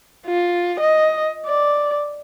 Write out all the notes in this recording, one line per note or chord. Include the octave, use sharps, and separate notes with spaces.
F4
D#5
D5